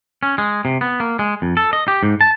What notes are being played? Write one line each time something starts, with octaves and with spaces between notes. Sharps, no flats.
C#4
G#3
C3
B3
A#3
G#3
F2
A4
D#5
G4
G#2
A5